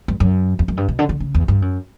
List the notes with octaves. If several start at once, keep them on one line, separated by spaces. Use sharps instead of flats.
G2
F#2
E2
F#2
G2
B2
D3
D3
C#3
E2
G2
F#2